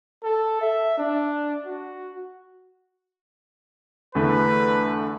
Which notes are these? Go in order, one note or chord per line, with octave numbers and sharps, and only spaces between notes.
A4
E5
D4
F#4
E2 D3 A3 B4